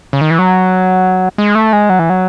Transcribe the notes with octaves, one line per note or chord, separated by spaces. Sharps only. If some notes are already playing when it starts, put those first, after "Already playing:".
C#3
D#3
E3
F#3
G#3
A3
G#3
F#3
E3
F#3